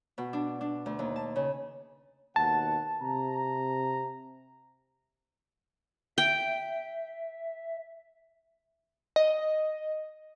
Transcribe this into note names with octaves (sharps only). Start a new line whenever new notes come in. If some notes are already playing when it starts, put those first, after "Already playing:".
B2
D4
D4
D2
D#2
A5
C#3
D#2 B2 F#5 A5
C3 A#5
E5 G5
D#5